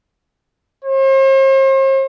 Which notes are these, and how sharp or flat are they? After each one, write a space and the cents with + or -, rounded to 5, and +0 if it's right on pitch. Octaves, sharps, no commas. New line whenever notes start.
C5 +45